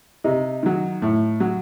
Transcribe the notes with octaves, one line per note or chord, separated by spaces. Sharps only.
C3 D#4
D#3 F#3
A2
F#3